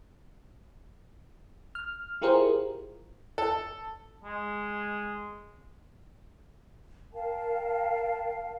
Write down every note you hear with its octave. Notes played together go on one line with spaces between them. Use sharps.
F6
E4 F4 G4 G#4 A#4 C5
A4
G#3
A#4 F5 G5 A5